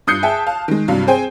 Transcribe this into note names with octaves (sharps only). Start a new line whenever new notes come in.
G2 D#6 F#6 G6 C7 C#7
G#4 E5 G5 A5
F5 A5
D#3 G#3
C2 G2 F#3 F5
C4 G#4 C5 G5 G#5